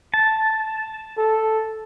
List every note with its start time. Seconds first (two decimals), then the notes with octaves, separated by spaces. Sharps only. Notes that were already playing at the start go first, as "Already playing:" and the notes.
0.14 A5
1.18 A4